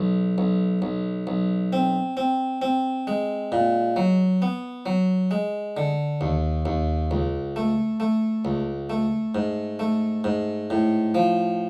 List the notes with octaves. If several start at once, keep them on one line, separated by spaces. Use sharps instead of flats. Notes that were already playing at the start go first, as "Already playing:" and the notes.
Already playing: B1
B1
B1
B1
C4
C4
C4
G#3
A#2
F#3
B3
F#3
G#3
D3
D#2
D#2
C#2
A3
A3
C#2
A3
G#2
A3
G#2
A2
F3